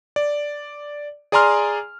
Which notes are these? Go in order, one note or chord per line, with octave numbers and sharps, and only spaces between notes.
D5
G#4 D5 G#5 A#5 C6 F6